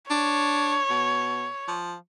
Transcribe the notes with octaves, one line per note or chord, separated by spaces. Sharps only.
D4 C#5
B2
F3